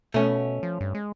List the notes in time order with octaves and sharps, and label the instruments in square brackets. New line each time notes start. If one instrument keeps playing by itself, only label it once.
[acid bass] B2 [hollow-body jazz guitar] A3 C#4
[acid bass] F3
G2
G#3